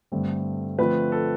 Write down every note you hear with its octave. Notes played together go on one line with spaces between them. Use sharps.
G2 D3 A3 C4
D3 F3 A3 C4 B4
A4